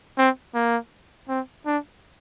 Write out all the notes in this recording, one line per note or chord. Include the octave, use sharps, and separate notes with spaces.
C4
A#3
C4
D4